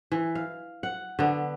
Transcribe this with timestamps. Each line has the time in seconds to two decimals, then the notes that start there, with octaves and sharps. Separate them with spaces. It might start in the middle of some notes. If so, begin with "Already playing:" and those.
0.12 E3
0.35 F5
0.83 F#5
1.19 D3 B3